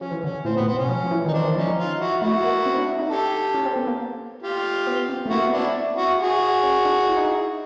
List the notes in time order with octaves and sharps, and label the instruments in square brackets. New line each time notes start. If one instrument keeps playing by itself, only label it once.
[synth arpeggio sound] F3 [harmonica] C#4
[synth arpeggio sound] E3
[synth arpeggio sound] D3 [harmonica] C#4
[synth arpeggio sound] A2 [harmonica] C4
[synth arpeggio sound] A2 [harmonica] B3
[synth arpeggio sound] A#2
[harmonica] C4
[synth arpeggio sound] B2
[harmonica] C#4
[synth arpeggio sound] F3
F3
E3
D#3
[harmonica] D#4
[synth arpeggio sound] E3 [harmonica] C4 D4
[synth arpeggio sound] D#3
[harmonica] E4
[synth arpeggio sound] F3 [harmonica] C#4 D#4
[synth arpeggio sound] F3
[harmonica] D#4 F4
E4 F#4
[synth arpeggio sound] A3 [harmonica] E4 F#4
[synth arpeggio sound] A#3
C4
D4
D4
D#4
[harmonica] G4 A4
[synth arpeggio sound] C#4
C4
B3
A#3
[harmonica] F4 G4
[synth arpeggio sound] B3
C4
A3
[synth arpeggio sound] A#3 [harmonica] E4 F#4
[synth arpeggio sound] B3
[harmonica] D4 E4
[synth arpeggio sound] C4
[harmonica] E4 F#4
F#4 G#4
[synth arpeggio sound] C#4
D4
E4
D#4
E4